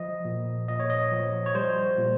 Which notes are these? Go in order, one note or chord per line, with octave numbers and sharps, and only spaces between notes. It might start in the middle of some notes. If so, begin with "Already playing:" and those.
Already playing: F3 D#5
A#2
A#2 D#5
C#5
D#5
F3
C#5
G3 C5
A#2